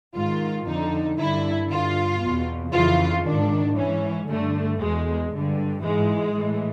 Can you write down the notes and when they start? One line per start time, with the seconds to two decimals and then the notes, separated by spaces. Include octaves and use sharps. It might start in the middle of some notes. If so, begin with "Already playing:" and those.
0.15 G#2 D#3 F4
0.67 F2 D3 D#4
1.19 G2 D3 E4
1.71 G2 D3 F4
2.22 E2 B2
2.73 F2 C#3 E3 F4
3.24 G#2 D#3 D4
3.77 G#2 E3 C#4
4.28 G2 D3 A3
4.80 E2 B2 G#3
5.32 G2 D3
5.83 G#2 E3 G#3
6.35 A2 E3